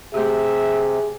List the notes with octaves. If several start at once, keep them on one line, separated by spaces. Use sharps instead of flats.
C3 A3 G4 G#4 E5